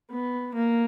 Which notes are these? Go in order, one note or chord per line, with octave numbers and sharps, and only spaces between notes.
B3
A#3